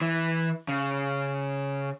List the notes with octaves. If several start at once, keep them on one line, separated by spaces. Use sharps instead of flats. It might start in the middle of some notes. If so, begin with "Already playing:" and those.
E3
C#3